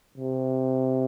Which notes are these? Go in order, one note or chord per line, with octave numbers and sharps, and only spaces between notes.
C3